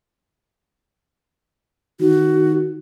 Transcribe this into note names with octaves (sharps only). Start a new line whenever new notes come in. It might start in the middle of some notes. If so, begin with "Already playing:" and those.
D#3 F#4